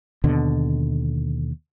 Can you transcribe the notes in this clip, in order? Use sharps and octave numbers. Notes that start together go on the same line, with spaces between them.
D#2 B2 D3